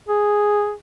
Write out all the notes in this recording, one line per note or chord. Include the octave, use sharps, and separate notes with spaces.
G#4